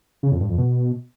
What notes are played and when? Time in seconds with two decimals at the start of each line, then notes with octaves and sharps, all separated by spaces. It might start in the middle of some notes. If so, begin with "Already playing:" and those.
0.23 C#3
0.32 F2
0.41 G2
0.49 F2
0.58 B2